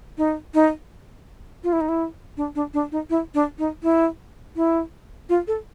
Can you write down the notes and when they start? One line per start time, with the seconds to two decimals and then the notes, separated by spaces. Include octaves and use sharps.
0.18 D#4
0.54 D#4
1.64 F4
1.73 E4
1.81 D#4
1.89 E4
2.37 D4
2.55 D4
2.74 D4
2.92 D#4
3.10 E4
3.35 D4
3.59 D#4
3.83 E4
4.56 E4
5.29 F4
5.48 A4